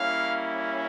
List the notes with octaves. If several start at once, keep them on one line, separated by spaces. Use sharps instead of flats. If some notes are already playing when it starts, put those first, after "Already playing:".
Already playing: G3 A#3 C#4 E4 F5